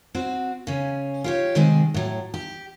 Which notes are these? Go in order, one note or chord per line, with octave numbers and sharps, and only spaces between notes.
C4 F#4
C#3 C#4
F4 G4 C#5
C3 D#3 G#3 C4
A2 F#3
G4